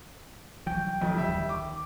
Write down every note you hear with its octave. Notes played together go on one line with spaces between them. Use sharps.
C2 E3 F#3 G5
B1 F2 D3 D#3 F3
G3 E5
D#2 D3
D6